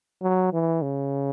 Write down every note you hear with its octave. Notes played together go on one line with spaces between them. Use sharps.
F#3
E3
C#3